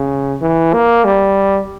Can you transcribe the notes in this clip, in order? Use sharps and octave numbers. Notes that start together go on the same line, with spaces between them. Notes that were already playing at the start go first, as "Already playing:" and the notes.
Already playing: C#3
E3
A#3
G3